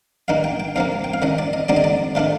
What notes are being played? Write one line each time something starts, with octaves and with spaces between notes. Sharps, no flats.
G2 D#3 A#3 D#4 F5
G5
G5
D2 C3 F3 A#3 F5
G5
F5
C2 C3 D#3 D#5
D5
D#5
D#2 D3 G3 C4 D#4 D5
D#5
D5
C3 D#3 A3 D4 F4